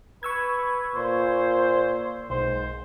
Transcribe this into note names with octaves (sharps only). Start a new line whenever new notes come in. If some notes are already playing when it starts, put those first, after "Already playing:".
B4 C#6 E6 G#6
A#2 C5
B1 G#2 C5